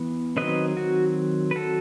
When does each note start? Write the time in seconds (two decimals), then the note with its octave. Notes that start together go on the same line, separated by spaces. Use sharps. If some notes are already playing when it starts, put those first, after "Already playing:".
Already playing: E3 B3
0.37 D#3 F#3 C4 B4 D#5
0.77 F#4
1.51 B4
1.56 F#4 A4